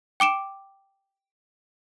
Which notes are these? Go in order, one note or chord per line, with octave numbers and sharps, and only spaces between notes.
G5 D6 D7 E7